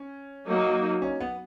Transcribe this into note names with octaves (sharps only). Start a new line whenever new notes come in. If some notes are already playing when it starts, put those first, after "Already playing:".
Already playing: C#4
F#3 A#3 D#4
C#4
B3